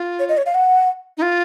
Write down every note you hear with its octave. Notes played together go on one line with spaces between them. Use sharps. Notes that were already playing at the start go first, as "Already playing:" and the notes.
Already playing: F4
C#5
D#5
C#5
F5
F#5
D#4
F4